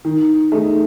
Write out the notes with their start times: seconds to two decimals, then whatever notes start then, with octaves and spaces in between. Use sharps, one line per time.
0.05 D#3
0.52 A3 D#4 G#4